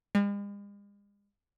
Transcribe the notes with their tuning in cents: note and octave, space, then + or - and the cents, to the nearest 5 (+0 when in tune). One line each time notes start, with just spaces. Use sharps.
G#3 -45